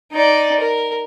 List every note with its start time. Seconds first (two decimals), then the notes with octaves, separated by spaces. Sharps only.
0.12 D#4 D5
0.60 A#4